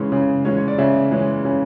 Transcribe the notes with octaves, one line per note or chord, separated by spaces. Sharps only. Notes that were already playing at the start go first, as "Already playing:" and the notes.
Already playing: C#3 E3 G#3 C#4
C#3
E3 G#3 C#4
C#5
D5
C#3 E5
E3 G#3 C#4
C#3